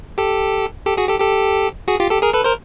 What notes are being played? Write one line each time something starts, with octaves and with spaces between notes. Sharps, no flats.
G4 A4
G4 A4
F#4 G#4
G4 A4
G4 A4
F#4 G#4
F4 G4
G4 A4
G#4 A#4
A4 B4
A#4 C5